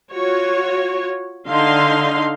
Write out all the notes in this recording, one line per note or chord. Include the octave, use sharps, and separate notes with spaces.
F4 F#4 C#5
D3 D#4 F5 C6